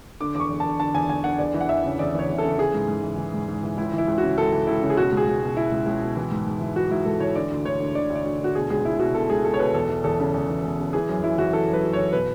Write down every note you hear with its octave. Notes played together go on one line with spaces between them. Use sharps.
D3 D6
E2 D6
C#6
E2
D3 A5
D3 A5
E2 G#5
E2 G#5
D3 F#5
E2 D5
E3
F#5
E2 E5
C#3
E2 D5
E3 C#5
E2
A4
C#3
E3 G#4
G#2
G#2
E3
E3
G#2
G#2
E3
C#2 E4
E3 E4
C#2
C#3 F#4
C#2 A4
E3
C#2 E4
C#3
G#4
B2 F#4
C#2
G#4
C#2
B2
B2 E4
C#2
C#2
B2
E3
G#2
G#2
E3
E3 F#4
G#2 E4
G#2 A4
E3 C#5
D3 D5
D2
D2 C#5
D3
D3 D5
D2
D5
D2
D3 F#4
B2 G#4
C#2 G#4
C#2 E4
B2 F#4
B2 A4
C#2 G#4
C#2 A4
C#5
B2 B4
E2 A4
E3
E2 A4
C#3
E2
E3
E2
C#3
E3 G#4
F#2
F#2 E4
E3 F#4
E3 A4
F#2 B4
F#2
E3 C#5
B2 B4